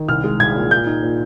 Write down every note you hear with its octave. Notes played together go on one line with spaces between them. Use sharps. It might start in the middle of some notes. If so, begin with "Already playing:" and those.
Already playing: D#3
C2 F6
G#3
C2 G#6
A#2
A#2 G6
D#4
A#2